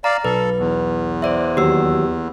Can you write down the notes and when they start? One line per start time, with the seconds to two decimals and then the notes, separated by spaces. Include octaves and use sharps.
0.04 D5 F5 A#5
0.25 B1 A4 B4
0.57 E2
1.22 C5 D5 E5
1.57 D#2 F#3 B3 G4 E6